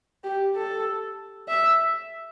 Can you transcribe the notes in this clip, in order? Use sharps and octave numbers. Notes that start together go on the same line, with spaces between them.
G4
A4
E5